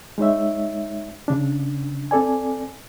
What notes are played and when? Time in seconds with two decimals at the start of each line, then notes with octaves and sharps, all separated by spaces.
0.18 G#3 D#4 C#5 E5
1.28 C#3 D4
2.11 C4 A4 D5 G#5